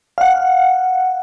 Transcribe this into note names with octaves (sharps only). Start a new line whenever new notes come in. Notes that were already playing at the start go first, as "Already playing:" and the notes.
F5 F#5